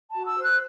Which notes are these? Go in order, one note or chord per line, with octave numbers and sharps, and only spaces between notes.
F#4 A5
E6
C5
F#6